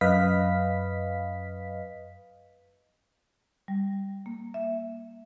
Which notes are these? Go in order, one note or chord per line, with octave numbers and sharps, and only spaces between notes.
F#2 B4 D#5 F5 B6
G3
A#3
E5